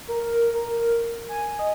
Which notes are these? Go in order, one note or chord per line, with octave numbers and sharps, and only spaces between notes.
A#4
A#4
G#5
D#5